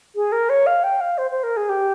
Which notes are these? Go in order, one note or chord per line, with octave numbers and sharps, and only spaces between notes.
G#4
A#4
C#5
F5
G5
F5
C5
C5
A#4
G#4
G4